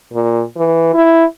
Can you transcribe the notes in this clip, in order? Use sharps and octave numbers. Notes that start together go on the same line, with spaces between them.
A#2
E3
E4